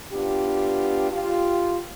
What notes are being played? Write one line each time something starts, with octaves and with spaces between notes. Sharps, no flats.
B3 D4 F4 G4
F4 G4